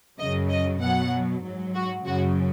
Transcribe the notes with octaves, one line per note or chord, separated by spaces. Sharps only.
F#2 C#3 F#3 D#5
D#5
B2 F#5
F#3
G#2 F#3
F#4
F#2 C#3 F#3 F#4